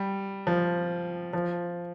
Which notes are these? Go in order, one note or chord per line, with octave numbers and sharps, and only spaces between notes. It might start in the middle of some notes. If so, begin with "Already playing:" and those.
Already playing: G3
F3
F3